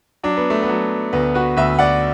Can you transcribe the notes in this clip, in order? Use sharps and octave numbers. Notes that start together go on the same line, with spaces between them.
F#3 D4
B3
A3
B3
F#3
D2 B3
F#4 B4
D2 B4 E5
D5 F#5